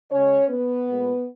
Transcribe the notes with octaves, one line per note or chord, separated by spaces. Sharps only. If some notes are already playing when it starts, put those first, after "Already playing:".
C#3 G#3 C#4 C#5
B3 B4
A#2 G#3